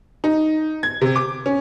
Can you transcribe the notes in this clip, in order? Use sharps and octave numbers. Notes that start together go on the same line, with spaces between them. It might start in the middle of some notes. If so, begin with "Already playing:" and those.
D#4
G#6
C3
D6
C#4